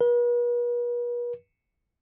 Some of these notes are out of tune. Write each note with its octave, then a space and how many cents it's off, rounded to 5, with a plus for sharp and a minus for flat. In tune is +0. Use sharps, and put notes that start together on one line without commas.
B4 -45